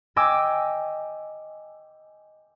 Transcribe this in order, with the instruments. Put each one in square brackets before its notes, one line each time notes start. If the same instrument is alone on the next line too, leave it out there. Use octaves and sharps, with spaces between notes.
[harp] D#5 G5 G#5 D6 E6